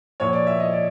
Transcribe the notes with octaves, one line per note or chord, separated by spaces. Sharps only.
A#2 F3 C#5
D5
E5
D#5
D5